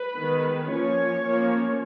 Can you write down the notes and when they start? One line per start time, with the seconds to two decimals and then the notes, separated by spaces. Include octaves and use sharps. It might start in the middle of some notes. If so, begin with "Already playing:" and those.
Already playing: B4
0.16 D#3 G#3 B3
0.68 F3 A#3 C#4 C#5
1.22 F3 A#3 C#4